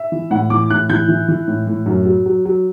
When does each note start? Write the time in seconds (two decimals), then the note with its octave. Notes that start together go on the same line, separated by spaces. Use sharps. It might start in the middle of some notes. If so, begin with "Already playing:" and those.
Already playing: E5
0.12 E3
0.31 A2 F#5
0.50 E3 D6
0.70 A2 F#6
0.89 E3 G6
1.09 E3
1.28 E3
1.48 A2
1.67 A2
1.86 F#2
2.05 F#3
2.26 F#3
2.45 F#3